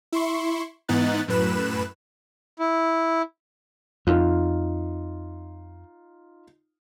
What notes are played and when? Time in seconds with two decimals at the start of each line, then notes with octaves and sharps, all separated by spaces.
0.12 E4 C6 C#6
0.88 G#2 E3 B3 D#4 F#6 A6
1.28 F#2 A2 B4 F#6 E7
2.59 E4
4.07 F2 D#4 F4